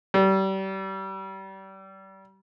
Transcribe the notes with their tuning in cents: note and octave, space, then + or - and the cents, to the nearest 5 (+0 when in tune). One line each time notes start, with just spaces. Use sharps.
G3 -30